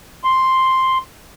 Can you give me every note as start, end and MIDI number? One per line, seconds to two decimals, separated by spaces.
0.24 0.98 84